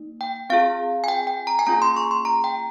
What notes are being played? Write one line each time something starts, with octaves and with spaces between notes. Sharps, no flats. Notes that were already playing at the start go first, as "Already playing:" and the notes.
Already playing: A#3 D#4
G5
C4 F4 G#4 F5
G#5
G5
G5
A#5
G#5
A#3 C#4 F4 G#4 A#5
C6
C#6
C6
A#5
G5